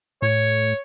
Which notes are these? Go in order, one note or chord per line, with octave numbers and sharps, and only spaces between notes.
A2 C#5